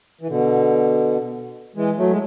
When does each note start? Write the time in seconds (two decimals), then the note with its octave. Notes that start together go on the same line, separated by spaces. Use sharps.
0.21 E3
0.28 B2 D3
1.76 E3 G#3
1.97 F#3 A3
2.10 G#3